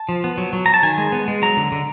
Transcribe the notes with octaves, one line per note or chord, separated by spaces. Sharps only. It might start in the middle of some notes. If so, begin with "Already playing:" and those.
Already playing: A5
F3
B3
F#3
F#3
F#3 A#5
A5
D#3 G#5
G#3
B3
G#3
F#3 A#5
D3
D3